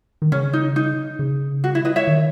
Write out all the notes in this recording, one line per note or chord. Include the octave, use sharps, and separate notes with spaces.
D#3
C#3 C#4
D#4
D#4
C#3
F#4
E4
B4 D#5
C#5 E5
D#3